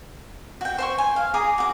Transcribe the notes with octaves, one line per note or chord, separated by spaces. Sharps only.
F#4 G5
C5 G5 C#6
G#5
F5
G#4 A#5 D6 D#6
F#4 D6